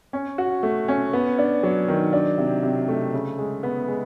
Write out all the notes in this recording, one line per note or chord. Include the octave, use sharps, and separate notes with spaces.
C#4
F#4
A3
C#4
B3
D4
F#3
D#3
D4
C3
C3
A3
C#3
G#3
B3
G#3